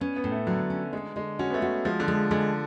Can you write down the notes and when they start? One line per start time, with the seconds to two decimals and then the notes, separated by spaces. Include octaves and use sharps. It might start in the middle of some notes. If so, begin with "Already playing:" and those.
0.01 B3 C#4
0.16 B3
0.24 A2
0.32 A3
0.47 D3 F#3
0.70 C#4
0.93 D3 G#3
1.16 D3 G#3
1.39 C#4 F#4
1.50 B3
1.54 A3
1.62 F#4
1.85 F3 G#3
2.00 D3
2.08 G#3
2.31 D3 G#3